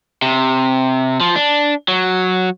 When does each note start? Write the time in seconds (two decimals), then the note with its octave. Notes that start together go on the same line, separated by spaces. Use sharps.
0.22 C3
1.20 F3
1.36 D4
1.88 F#3